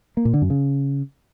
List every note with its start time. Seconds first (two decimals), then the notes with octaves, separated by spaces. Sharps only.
0.17 A#3
0.25 A#2
0.34 D3
0.42 F#2
0.50 C#3